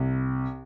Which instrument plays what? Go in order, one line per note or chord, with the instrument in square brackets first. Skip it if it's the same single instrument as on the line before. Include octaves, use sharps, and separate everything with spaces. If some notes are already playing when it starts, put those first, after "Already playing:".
Already playing: [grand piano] C2